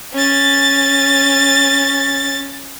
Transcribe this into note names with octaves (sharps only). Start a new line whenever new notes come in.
C#4 A6